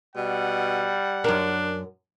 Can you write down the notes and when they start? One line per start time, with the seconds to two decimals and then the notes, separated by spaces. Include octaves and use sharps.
0.16 B2 G3 F#5
1.24 F#2 D4 A#4